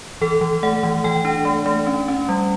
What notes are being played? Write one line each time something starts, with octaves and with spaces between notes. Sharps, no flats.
E3 A4
E3
A3 F#5
E3
E3 G5
D4
A3
A3
C#4
C#4
G3